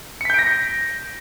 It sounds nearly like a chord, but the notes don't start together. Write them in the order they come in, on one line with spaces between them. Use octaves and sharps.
C#7 B6 G6 D7 A#6